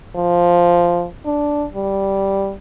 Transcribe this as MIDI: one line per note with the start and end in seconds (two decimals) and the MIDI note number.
0.15 1.05 53
1.26 1.65 62
1.73 2.52 55